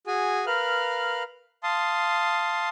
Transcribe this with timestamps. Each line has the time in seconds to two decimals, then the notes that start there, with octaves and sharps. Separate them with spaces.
0.07 F#4 G#4 G#5
0.47 A#4 B4 F5 F6 F#6
1.63 F5 A5 C6 D#6